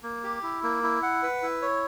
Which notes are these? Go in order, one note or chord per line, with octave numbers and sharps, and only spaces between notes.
A#3
G4
E4
A#3
E4
F#5
B4
E4
C#5